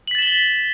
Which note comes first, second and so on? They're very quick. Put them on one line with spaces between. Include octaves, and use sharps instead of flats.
F#7 B6 A6 E7 G7